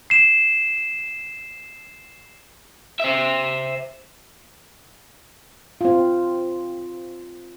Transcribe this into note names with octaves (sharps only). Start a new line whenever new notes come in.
C7 E7
C5 E5
C4 F4